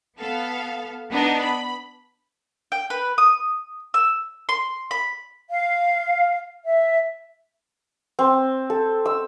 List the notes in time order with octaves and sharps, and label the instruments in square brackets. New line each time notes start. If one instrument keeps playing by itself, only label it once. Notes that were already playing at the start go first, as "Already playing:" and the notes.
[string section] B3 A4 F5
B3 D4 D#4
B5
[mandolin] G5
B4
D#6
E6
C6
B5
[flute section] F5
E5
[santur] C4
A4
E6